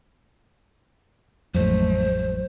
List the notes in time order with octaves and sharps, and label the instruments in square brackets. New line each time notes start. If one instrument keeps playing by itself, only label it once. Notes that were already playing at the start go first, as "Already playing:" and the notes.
[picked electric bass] A1 F2 [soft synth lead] F#3 [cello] G#3 A3 [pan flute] C5